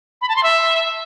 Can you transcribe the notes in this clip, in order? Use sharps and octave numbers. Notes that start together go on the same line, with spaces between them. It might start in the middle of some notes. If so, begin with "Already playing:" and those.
B5
A5
C6
E5